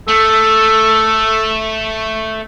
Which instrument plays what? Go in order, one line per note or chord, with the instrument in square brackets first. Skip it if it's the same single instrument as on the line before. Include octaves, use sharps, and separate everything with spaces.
[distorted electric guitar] A3 [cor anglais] A4